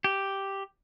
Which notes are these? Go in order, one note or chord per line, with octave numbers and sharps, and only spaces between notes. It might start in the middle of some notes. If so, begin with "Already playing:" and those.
G4